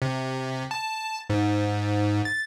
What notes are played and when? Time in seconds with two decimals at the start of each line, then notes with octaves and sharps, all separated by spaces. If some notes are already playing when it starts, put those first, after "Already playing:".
0.02 C3
0.71 A5
1.30 G#2
2.25 A6